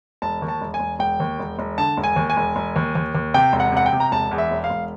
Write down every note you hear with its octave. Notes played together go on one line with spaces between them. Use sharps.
E1 A5
D#2
A5
E1
G#5
E1
E1 G5
D#2
E1
E1
D3 A5
E1
G#5
D#2
G#5
E1
E1
D#2
D#2
D#2
C3 G5
E1
F#5
C3 F#5
G5
C3
A#5
E1 A5
E2
E5
E1
F5
E1